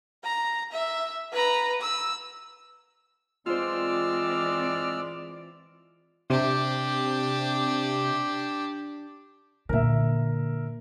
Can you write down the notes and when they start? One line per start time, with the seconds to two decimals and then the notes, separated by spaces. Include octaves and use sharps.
0.24 A#5
0.72 E5
1.32 B4 A#5
1.81 E6
3.46 E3 G#3 C4 F4 C5 D5 E6 F6
6.30 C3 D4 G4
9.69 A#2 D3 A#4 E5